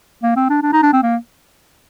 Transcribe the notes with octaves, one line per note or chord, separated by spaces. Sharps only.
A#3
C4
D4
D4
D#4
D4
C4
A#3